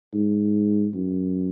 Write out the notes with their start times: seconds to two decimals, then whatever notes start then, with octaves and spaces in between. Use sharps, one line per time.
0.14 G#2
0.94 F#2